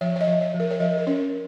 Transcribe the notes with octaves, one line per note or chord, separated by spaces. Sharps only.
F3 C#5
C#5
D#5
F3
C#5
F3
A#4
C#5
F3 D#5
A#4
C#4 C#5